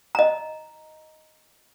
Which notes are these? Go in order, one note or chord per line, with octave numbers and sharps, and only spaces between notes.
D#5 A#5